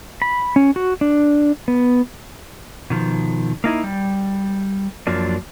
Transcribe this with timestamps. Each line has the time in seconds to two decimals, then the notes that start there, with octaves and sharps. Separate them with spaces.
0.22 B5
0.56 C#4
0.76 F#4
1.01 D4
1.68 B3
2.90 B2 D#3 F3
3.64 A#3 D#4 E4
3.84 G3
5.07 F#2 F3 F#3 A#3 D4